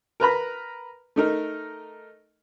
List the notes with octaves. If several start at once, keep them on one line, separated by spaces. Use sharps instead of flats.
A#4 B4 A#5 B5
A3 D#4 A#4